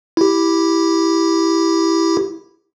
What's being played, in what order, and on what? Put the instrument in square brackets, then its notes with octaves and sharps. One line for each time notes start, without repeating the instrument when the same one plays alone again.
[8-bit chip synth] E4 G4